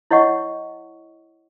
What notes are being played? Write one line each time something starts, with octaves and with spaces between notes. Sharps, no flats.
E4 C#5 D#5 F#5 C#6